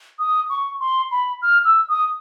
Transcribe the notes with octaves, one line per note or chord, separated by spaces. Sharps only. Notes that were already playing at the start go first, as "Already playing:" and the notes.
D#6
C#6
C6
B5
F6
E6
D#6